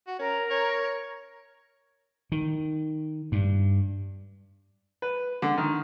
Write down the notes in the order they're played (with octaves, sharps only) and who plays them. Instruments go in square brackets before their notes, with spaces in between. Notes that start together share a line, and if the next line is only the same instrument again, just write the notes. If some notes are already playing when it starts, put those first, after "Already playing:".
[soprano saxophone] F#4
[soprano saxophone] C#4 [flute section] A#4 A#5
[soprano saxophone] C#5
[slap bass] D#3
G2
[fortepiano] B4
D3
D#3